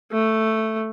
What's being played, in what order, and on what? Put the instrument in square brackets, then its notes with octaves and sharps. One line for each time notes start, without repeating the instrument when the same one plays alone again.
[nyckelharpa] A3